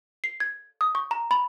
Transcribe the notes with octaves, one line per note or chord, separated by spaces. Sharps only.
C7
G#6
D#6
C#6
A#5
B5